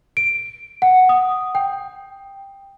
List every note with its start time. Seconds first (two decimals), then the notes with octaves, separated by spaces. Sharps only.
0.17 D7
0.82 F#5
1.09 D#6
1.55 G5